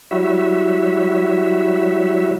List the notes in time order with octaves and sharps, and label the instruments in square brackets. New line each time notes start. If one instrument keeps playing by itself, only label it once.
[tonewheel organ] F#3 G3 E4 F#4 E5